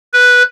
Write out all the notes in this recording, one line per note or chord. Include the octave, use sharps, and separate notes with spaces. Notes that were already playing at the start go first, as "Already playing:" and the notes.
B4